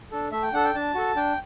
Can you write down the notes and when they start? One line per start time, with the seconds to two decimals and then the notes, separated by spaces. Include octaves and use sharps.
0.11 D4 A4
0.32 A3 E5
0.43 G5
0.53 D4 A4 F#5
0.64 G5
0.75 D4 A5
0.95 F#4 A4
1.16 D4 G5